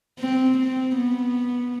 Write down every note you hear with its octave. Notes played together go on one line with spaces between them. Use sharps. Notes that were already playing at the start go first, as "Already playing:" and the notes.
C4
C4
B3